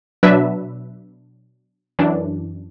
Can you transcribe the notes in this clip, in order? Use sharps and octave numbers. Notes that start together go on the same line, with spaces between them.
B2 F#3 D4 B4 E5
F#2 E3 D4